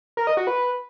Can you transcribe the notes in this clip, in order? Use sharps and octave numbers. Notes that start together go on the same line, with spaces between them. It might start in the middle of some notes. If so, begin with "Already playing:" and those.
A#4
D#5
F#4
B4